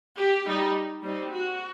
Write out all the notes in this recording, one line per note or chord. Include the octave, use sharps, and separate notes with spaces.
G4
G3 D#4
G3 C4 D#4
F#4